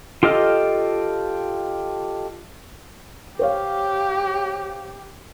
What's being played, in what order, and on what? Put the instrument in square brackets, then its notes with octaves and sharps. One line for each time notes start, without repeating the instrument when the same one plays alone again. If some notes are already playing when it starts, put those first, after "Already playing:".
[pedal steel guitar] F4 G4 A4 D#5 F6
[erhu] G4 [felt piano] C5 C#5 F5